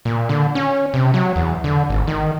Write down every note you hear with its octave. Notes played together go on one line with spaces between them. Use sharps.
A#2
D3
C#4
C3
F#3
E2
D3
G#1
D#3